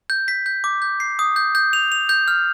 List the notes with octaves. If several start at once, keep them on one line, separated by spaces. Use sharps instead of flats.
G6
B6
G6
D6
G6
C7
D#6
G6
G6
F7
F7
G6
F6